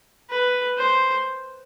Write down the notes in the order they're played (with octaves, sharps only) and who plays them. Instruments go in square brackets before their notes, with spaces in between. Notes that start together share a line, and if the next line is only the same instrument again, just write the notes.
[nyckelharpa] B4
C5